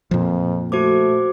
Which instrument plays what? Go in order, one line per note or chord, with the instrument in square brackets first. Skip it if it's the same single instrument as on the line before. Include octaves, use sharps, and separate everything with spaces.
[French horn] F2 [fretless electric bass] A#2 F3
[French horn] A3 [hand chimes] F#4 C5 D6